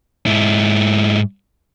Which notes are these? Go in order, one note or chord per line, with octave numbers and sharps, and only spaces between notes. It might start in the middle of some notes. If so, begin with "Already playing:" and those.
G#2 E4